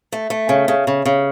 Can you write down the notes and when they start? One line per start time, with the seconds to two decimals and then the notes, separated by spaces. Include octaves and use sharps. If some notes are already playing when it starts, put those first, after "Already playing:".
0.12 A3
0.30 A3
0.49 C#3
0.68 C#3
0.87 C#3
1.06 C#3